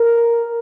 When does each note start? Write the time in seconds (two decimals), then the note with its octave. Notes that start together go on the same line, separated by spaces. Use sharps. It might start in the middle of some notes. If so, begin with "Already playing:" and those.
Already playing: A#4